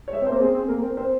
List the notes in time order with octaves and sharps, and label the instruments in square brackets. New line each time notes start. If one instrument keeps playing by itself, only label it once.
[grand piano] C#5
[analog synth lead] G#3 [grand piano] E5
[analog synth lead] C4
[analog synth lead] A#3 [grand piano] C5
[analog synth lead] C4 [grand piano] G#4
[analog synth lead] C4
[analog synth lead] A#3 [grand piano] A#4
[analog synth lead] C4
[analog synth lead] C4 [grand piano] C5